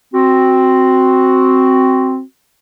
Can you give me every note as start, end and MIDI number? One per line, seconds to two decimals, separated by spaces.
0.14 2.21 60
0.14 2.21 66